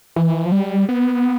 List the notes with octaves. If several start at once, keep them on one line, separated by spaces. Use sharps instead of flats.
E3
F3
G3
B3